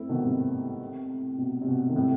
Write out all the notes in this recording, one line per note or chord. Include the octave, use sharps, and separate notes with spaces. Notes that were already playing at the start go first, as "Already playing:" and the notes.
Already playing: A3 C4 E4
B2 D#3
A2 C3
B2
C3
B2
D#3
A2 C3